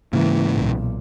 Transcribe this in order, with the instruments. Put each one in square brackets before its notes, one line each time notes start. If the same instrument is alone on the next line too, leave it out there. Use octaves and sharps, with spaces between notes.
[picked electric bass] G#2 C#3 A#3 [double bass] E3
[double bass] B1 A#2